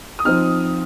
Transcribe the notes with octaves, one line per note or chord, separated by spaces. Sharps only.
D#6
F3 C4 D#4 F6